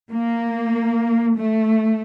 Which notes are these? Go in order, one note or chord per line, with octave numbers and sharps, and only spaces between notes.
A#3
A3